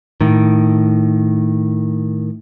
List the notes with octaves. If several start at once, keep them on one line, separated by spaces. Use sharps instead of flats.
A2 D#3